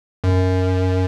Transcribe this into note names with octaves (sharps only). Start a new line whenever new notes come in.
F#2